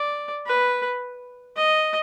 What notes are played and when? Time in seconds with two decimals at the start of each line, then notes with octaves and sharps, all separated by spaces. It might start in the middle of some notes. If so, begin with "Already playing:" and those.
Already playing: D5
0.46 B4
1.57 D#5